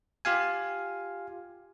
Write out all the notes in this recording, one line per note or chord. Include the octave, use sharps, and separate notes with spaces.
F4 G4 F5 G#5